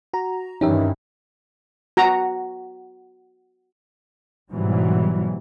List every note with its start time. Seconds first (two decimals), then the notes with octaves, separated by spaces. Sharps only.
0.14 F#4 A#5
0.61 G2 D#3 E3 C#4 D#4 G4 E5
1.97 F#4 A#5
4.53 G#2 B2 E3 F#3 G3